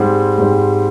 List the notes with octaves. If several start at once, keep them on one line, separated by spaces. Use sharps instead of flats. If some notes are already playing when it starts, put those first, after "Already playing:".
Already playing: G#2 G3 C4
G#2 G3 C4